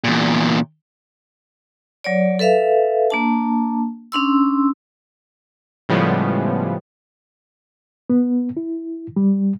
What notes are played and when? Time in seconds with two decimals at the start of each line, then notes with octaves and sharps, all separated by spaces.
0.04 E2 A#2
2.04 F#3 C#5 D5
2.39 A4 B4 E5 F5
3.10 A#3 D4 A5
4.12 C#4 D4 C6 E6
5.89 A2 C#3 F3 G3 G#3 B3
8.10 B3
8.57 E4
9.16 G3